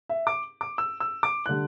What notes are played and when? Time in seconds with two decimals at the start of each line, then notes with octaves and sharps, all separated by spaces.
0.09 E5
0.27 D6
0.61 D6
0.78 E6
1.00 E6
1.23 D6
1.46 D3 G3 F#6